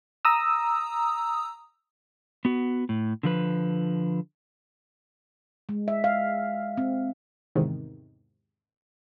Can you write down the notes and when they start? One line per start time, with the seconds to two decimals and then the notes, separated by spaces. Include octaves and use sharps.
0.25 A#5 D#6 E6
2.45 B3 F#4
2.89 A2
3.23 D3 F3 B4
5.69 G#3
5.88 E5
6.04 F5
6.78 C4
7.55 E2 G#2 C3 D#3